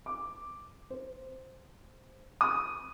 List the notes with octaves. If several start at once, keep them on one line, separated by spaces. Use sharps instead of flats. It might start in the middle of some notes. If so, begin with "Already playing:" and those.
D6
C5
D#6